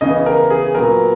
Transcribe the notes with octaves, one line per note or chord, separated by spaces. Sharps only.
C#3 E3 B3 D#5
A#4
G#4
A#2 F#3 B3 A#4